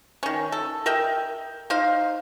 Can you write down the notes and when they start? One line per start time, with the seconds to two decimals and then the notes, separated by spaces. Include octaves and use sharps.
0.23 D#3 C#4
0.52 A4
0.86 A#4 D#5 E5 G5
1.70 D#4 C5 F5